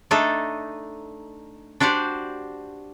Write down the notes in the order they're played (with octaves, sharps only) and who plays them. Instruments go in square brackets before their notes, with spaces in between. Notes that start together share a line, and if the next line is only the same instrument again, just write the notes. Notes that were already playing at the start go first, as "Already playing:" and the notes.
[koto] A3 D4 D#4 A4
D4 F#4 G4 C5 D5